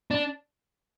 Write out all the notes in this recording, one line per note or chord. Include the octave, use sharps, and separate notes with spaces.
D4